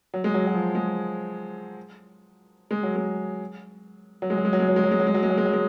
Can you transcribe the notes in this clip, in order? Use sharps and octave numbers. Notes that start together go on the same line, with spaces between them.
F#3
G#3
F#3
F#3
F3
G#3
G#3
F#3
G#3
F#3
G#3
F#3
G#3
F#3
G#3
F#3
G#3
F#3
G#3
F#3
G#3
F#3
G#3
F#3
G#3
F#3
G#3